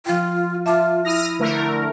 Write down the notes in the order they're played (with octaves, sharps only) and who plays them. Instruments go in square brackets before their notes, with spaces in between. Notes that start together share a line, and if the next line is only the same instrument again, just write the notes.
[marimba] F3 G5 [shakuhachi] F4
[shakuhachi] F4 [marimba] E5 A5 D6
[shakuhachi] E4 [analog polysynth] D#6 F6 A#6
[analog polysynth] D3 A3 A#4